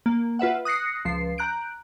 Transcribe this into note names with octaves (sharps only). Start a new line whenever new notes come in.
A#3
F4 B4 E5 F#5
D#6 F#6 A#6 C7 C#7
C#2 F3 C7
A#5 F#6 G6 D7